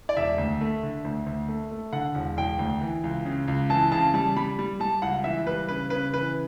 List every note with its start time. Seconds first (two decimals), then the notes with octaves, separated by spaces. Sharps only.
0.09 D5
0.17 E1 E5
0.38 D2
0.61 A3
0.83 D3
1.04 D2
1.26 D2
1.48 A3
1.71 A3
1.92 D3 F#5
2.15 E1
2.37 E1 G5
2.59 D2
2.81 E3
3.03 C#2
3.26 C#3
3.48 C#2
3.69 E3 A5
3.92 C#3 A5
4.14 G3 A5
4.36 G3 B5
4.59 G3
4.80 G3 A5
5.02 C#2 F#5
5.24 E3 E5
5.46 G3 B4
5.69 C#3 B4
5.90 C#3 B4
6.14 E3 B4